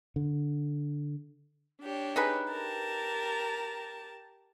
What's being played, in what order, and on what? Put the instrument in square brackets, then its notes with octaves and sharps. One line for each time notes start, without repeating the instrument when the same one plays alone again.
[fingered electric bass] D3
[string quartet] D4 G4 C#5
[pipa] D#4 G#4 B4
[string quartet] G4 A#4 A5